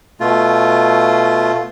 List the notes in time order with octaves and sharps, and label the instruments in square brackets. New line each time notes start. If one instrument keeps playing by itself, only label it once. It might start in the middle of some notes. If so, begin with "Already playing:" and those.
[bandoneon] B2 A3 F4